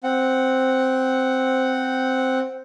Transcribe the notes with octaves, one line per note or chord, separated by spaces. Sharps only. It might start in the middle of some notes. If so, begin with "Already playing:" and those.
C4 F#5